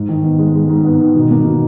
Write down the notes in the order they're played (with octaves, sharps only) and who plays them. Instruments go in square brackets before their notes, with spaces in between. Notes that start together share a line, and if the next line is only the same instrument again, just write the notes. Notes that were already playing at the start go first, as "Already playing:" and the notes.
Already playing: [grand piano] G#2
D#3
B3
G#3
G#3
G#2
B3
D#3
B2
A#3
B2